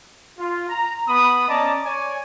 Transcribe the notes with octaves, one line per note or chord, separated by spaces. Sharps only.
F4
A#5
B3 B5 D#6
C#4 D5 D#5 A5 A#5 D6
C#5 D5 G#5